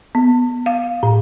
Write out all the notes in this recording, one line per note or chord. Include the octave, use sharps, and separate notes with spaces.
B3
F5
A2